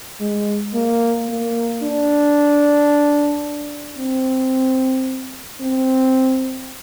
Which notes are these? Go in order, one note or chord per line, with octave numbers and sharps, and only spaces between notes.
G#3
A#3
A#3
D4
C4
C4